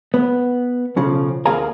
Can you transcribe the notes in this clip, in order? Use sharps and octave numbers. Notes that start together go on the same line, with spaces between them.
B3
B1 C#3 F3
D2 A#3 G#4 F5 G#5 A#5